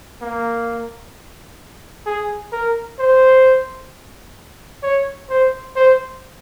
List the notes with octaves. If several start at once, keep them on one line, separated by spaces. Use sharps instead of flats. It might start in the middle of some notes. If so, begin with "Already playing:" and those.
A#3
G#4
A#4
C5
C#5
C5
C5